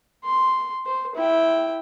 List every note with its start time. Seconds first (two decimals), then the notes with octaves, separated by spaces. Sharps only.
0.25 C6
0.86 C5
1.15 E4 G5